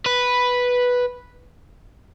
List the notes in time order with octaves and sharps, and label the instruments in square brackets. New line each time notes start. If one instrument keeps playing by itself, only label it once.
[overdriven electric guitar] B4